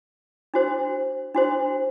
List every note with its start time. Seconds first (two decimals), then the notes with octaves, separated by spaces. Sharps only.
0.54 D4 F#4 C5
1.35 D4 F#4 C5